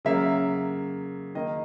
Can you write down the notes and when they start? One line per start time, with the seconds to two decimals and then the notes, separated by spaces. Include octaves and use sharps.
0.05 C#3 F#3 A#3 E5
1.35 D#3 A#3 D#5